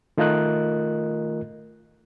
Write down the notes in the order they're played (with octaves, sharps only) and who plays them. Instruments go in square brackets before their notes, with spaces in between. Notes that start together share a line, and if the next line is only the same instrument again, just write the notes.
[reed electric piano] D#3 A3 F4 A#4 D#5 F#6